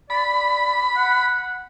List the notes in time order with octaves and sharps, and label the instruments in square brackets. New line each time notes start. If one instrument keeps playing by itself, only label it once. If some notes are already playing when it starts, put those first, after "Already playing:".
[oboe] D5 [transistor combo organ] B5
[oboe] F#5